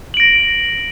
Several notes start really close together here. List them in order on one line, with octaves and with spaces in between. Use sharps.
F#7 D7 A#6